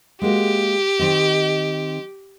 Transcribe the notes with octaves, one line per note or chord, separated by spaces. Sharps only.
G#3 A#3 F#4 G4
D#3 C4 D#5